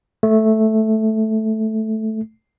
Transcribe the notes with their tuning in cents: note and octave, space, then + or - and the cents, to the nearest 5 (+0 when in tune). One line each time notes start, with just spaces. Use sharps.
A3 -5